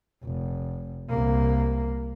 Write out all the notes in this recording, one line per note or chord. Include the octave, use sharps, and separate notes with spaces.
F1
C2 A#3